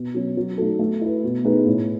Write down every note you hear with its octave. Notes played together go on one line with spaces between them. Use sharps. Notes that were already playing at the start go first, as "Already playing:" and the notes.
Already playing: B2
F#3 C#4
F#3
A3 D#4 F#4 A4
A3
E4 B4
B2
A3 D#4 G#4 B4
A2